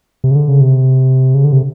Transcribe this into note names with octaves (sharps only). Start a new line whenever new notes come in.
C3
C#3
D3
C#3
C3
C#3
D3
C3